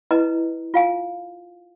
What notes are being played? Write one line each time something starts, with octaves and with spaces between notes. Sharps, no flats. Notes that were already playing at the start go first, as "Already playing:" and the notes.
E4 B4 D#5 A#5
F4 F5 G#5